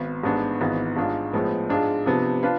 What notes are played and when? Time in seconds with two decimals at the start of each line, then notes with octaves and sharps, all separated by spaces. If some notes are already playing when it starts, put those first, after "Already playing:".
Already playing: G#1 B3
0.24 A1 G#2 G#3 B3 D4
0.61 G#1 G#2 E3 B3
0.97 A1 G#2 G#3 D4 F4
1.33 A2 F3 G#3 B3
1.69 G#2 G#3 D4 F4 G#4
2.06 C3 F3 B3 D4
2.43 D4 F4 B4